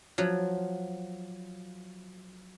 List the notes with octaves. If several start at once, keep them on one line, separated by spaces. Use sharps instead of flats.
F3 F#3